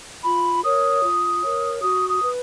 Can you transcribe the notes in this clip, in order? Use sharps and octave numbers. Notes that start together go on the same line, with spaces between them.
F4 B5
A#4 C#5 D#6
F4
A#4 C#5
F#4 D#6
D#6
B4